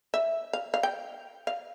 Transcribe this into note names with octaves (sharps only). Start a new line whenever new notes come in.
E5
F5
F5
G5
F5